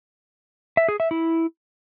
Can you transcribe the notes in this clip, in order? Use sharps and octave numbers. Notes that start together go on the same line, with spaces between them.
E5
G#4
E5
E4